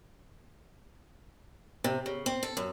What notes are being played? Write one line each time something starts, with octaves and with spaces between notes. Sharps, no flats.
C3
C#3
C4
A4
F#2